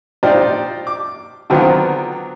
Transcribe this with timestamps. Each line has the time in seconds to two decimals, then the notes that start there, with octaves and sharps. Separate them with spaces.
0.23 D4 D#4 F4 G4 C5 D5
0.87 D6
1.50 D3 D#3 F#3 B3 C4 F4